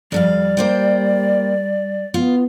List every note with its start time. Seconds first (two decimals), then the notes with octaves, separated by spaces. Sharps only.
0.12 F2 G3 A4 D5 F5
0.57 A#3 C5 G5
2.14 B3 F4